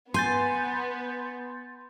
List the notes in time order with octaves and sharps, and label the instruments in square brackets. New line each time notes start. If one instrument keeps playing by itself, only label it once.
[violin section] B3 [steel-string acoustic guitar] G#5 [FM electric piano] C6 G6 A6